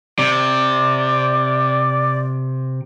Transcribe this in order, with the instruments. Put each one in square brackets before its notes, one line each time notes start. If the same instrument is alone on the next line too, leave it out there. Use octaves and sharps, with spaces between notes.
[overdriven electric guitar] C3 [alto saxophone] D5